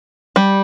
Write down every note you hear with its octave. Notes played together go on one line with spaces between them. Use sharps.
G3